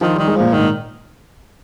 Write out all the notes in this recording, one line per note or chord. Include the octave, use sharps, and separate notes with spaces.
D#3 F3
D#3 G3
G#3
A#2 F3
G#2 D#3
A#2